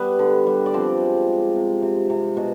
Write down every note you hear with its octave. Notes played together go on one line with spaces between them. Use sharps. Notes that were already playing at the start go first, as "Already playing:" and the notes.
Already playing: G3 B3 B4
D3
G3
D5
F3 C4 C5
G#3
G#3
C3
C3
C3
B2